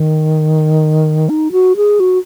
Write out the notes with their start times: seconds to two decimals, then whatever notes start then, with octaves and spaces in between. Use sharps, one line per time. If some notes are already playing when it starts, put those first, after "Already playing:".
Already playing: D#3
1.29 D#4
1.52 F#4
1.76 G#4
2.00 F#4